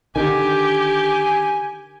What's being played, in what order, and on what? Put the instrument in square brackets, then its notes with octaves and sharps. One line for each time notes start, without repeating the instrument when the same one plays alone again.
[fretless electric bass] D3 D#3 [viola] G4 [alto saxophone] G#5